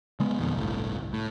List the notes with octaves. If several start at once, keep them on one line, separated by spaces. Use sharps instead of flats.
D3 G#3 B3
F2 B2 D#3
G1 C2 A2
A2